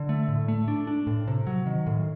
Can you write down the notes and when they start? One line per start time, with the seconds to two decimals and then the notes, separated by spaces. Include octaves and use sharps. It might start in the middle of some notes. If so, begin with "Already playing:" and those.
Already playing: D3
0.09 A3
0.28 A2
0.48 A3
0.68 D4
0.87 D4
1.07 A2
1.28 C3
1.47 F#3
1.66 D#3
1.87 A2